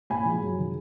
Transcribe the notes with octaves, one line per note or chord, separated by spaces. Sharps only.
A#2 G#5 B5
F3 G#3
F#2
D#3 G#3